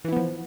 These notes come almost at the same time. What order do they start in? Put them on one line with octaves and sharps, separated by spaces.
E3 E4 B3 F3